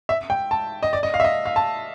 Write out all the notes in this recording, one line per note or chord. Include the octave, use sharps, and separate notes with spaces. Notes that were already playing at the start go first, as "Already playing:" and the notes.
E5
G5
A5
D#5
D5
D#5
F5
E5
D#5
F5
A5